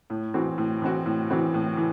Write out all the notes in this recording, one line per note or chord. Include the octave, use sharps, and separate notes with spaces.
A2
E3 C4 F#4
A2
E3 C4 F#4
A2
E3 C4 F#4
A2
E3